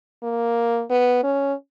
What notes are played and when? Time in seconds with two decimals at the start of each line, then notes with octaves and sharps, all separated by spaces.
0.23 A#3
0.90 B3
1.24 C#4